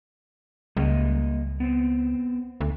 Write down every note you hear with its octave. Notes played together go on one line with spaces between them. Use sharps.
C#2 G3 A#3 D#5
B3 C4
D2